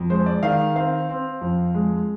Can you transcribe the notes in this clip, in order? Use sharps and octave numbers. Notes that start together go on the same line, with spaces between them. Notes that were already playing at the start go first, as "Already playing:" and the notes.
Already playing: F2
G#3 C5
D5
D#3 F5
C4 F5
C4
F2
G#3